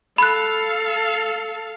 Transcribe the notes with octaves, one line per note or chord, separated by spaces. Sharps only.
A4 F5 B5 F#6